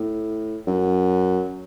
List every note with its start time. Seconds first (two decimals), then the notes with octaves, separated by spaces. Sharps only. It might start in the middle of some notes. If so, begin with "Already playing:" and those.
Already playing: A2
0.67 F#2